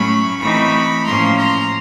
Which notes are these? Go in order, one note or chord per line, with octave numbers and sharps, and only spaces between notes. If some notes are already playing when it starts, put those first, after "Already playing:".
Already playing: A2 F#3 A3 C#4 B5 C#6
E3 A3 C4 D#4 B5 C#6
A2 F3 A#3 C#4 A#5 C6
A#5 C6